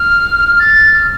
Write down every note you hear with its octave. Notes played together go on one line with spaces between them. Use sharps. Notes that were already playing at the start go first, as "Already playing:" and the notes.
Already playing: F6
A6
F6